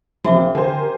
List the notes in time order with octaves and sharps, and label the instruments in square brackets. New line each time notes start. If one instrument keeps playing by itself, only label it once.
[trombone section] A#1 A#3 C4 [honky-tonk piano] C#3 [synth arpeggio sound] F3 [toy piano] F#4 E5 D6
[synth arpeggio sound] D3 [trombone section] G4 A#4 [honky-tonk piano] C5 G#5